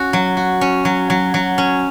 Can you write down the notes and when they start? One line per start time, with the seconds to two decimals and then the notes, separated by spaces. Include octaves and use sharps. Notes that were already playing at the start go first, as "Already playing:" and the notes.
Already playing: C#4 F#4
0.13 F#3
0.37 F#4
0.61 C#4
0.85 F#3
1.10 F#3
1.34 F#3
1.58 C#4